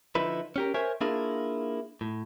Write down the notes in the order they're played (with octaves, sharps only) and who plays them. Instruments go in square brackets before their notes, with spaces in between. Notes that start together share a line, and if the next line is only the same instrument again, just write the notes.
[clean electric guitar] D3 F3 D#4 E4 B4
C#4 G4 A#4
A#4 C5 C#5 E5 G#5
A#3 D4 E4 F4 G#4 A#4
A2